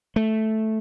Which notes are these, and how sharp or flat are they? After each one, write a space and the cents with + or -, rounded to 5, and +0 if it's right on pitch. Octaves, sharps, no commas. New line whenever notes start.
A3 -5